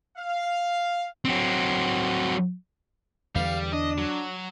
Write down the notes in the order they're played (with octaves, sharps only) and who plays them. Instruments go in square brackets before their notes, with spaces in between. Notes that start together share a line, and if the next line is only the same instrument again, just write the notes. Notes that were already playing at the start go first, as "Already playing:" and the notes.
[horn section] F5
[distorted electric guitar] F#3 C4
[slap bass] E2 D3 E3 [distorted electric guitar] G3 [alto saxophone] F5
[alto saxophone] D4 [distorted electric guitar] D#5
[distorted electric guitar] F#3